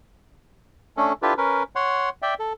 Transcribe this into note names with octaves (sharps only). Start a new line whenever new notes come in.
A3 C#4 D4 A4
D4 E4 F4 G4 A4 B4
C#4 A#4 B4
C#5 F#5 C6
D5 E5 G5
A4